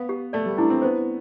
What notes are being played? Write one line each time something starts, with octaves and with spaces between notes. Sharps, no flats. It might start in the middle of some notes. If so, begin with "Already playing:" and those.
Already playing: B3 F5
G4
A3 D5
G3
D4 E4
C4
B3 C5